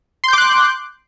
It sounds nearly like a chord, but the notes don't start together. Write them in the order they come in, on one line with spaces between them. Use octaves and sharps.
C6 G6 D6 F#6